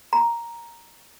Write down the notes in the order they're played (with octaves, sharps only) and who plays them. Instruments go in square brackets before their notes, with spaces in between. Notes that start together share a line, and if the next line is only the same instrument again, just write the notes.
[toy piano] A#5